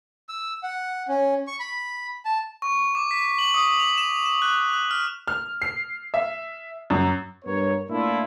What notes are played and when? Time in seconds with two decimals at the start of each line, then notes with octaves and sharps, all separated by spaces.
0.29 E6
0.63 F#5
1.08 C#4
1.47 C#6
1.59 B5
2.25 A5
2.62 C#6
2.95 D6
3.11 B6
3.39 F#7
3.54 D#6
3.80 F7
3.97 E7
4.26 E7
4.42 F#6
4.73 F#6
4.91 F6
5.27 F6
5.62 C7
6.14 E5
6.90 F#2
7.45 G2 B3 A#4 C#5
7.90 A2 A#3 D4 E4 F4